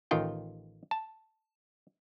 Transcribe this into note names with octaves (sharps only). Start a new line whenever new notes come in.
A1 D#3 F4 G5
A5